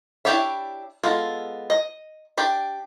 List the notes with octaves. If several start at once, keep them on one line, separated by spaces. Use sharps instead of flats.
D4 E4 G4 C#5 E5
G#3 B3 F4 A4
D#5
D4 G4 D5